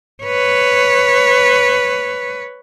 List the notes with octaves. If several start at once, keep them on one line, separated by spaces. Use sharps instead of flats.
B4 C#5